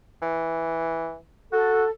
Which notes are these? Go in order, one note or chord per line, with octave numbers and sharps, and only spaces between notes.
E3
F#4 A4